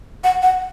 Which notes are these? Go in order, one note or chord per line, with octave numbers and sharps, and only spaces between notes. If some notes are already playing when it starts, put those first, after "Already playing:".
F#5
F#5